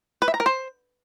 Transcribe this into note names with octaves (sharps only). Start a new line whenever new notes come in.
B4
E5
A#5
A#4
C5